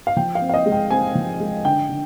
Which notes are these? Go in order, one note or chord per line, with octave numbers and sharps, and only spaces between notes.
F5
F3 G5
F5
C4
F5
D#5
G#3
G5
C4 G#5
F3
G#3
D3 G5
D3